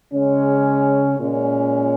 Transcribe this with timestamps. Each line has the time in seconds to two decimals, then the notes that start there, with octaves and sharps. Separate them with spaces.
0.12 C#3 G#3 C#4
1.17 A#2 G#3 C#4